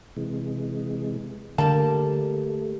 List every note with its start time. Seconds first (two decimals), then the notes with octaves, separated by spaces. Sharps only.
0.17 C3 E3 G#3
1.58 D3 G3 A3 A#3 A5